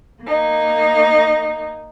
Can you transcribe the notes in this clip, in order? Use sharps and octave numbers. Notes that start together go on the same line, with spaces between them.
A#3 D#4